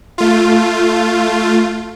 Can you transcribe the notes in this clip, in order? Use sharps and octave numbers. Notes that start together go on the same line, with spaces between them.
A3 F4